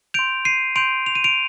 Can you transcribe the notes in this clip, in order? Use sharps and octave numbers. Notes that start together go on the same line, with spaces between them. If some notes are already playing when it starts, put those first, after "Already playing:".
C6 G6 D7 F7
C7 D#7
C6 G6 D7 F7
F7
D#7
D7 F7